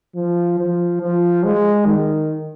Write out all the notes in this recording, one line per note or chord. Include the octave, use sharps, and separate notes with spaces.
F3
F3
F3
G#3
D#3